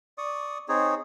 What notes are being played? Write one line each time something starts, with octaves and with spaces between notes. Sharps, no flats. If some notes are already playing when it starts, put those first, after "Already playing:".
D5 C#6 D#6
C4 D#4 G#4 C#5